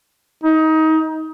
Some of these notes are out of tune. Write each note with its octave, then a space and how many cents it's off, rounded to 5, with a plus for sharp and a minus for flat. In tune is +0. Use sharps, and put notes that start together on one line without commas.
D#4 +25